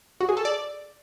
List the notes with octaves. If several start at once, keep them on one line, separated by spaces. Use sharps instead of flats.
F#4
G#4
A4
D5